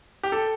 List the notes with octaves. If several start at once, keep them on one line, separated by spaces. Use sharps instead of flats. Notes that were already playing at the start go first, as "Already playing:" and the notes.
G4
A4